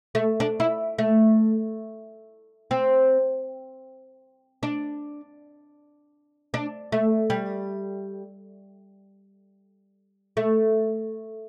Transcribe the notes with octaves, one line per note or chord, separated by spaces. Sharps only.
A3
D4
E4
A3
C4
D4
D4
A3
G3
A3